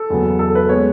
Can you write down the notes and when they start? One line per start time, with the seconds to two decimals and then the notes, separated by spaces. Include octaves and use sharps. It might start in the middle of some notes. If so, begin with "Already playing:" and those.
Already playing: A4
0.10 E2 C#3 F#3 B3
0.39 A4
0.55 B4
0.69 G#3 B3 C#5